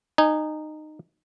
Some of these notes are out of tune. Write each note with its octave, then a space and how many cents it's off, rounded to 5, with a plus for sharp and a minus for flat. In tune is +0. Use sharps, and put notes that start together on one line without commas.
D#4 -20 G#5 +0